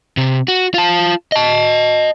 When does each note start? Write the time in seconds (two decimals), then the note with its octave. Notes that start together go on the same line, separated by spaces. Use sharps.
0.17 C3
0.48 F#4
0.74 F4 A5
1.32 D#5 A5